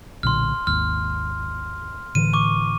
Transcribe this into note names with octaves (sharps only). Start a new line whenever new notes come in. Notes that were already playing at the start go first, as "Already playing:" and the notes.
B1 A#2 D3 C6 F6
G#1 D#2 F6
A2 D3 E3 D#7
C#6 D6